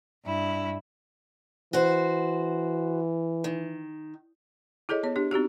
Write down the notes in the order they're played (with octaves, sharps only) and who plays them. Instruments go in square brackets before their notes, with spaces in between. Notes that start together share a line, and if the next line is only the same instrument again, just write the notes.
[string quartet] G2 E4
[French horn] E3 [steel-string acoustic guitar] F#4 C5
[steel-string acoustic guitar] D#3
[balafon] E4 G#4 A4 C#5 D#5
B3 C#5
D4 G4
C4 D#4 F#4 G4